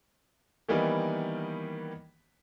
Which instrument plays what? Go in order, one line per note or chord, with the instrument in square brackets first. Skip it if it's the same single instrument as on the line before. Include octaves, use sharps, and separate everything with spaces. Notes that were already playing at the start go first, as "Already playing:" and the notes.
[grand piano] D#3 E3 G3 A#3 B3 D#4